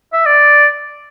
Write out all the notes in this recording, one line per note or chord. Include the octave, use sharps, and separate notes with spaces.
E5
D5